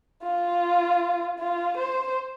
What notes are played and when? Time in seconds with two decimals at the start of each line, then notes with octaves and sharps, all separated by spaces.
0.23 F4
1.39 F4
1.77 C5